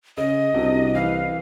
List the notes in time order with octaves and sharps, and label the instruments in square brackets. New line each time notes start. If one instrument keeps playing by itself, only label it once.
[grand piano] C#3 [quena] D#5
[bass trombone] C2 [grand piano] C3 D4 F#4
[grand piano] E3 B4 [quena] F5